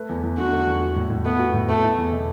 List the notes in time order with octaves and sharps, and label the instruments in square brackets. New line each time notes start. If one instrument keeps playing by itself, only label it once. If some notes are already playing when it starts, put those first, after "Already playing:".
Already playing: [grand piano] A3 B4
E2
E2
[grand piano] D3 [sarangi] F#4
[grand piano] A3
E2
F#4
A2
A2
[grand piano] A3 [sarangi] B3
[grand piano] F#4
A2
[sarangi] A3 [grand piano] B3
[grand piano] E4
E2
B2